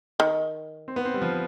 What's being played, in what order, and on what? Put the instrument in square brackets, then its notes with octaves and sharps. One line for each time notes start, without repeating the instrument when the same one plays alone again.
[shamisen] D#3
[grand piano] C4
B3
C4
G3
F3